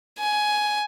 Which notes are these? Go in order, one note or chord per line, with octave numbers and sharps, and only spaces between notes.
G#5